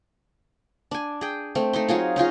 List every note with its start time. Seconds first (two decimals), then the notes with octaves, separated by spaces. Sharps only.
0.91 D4 G#5
1.21 G#4 G5
1.55 A3 C4
1.73 A3 D#4 C6
1.88 F#3 D#4 F4 G#4
2.16 C#4 D#4 F4 G#4